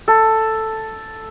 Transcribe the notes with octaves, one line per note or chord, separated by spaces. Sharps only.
A4